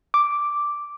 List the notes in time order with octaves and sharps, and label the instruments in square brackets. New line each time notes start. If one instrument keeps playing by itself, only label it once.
[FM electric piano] D6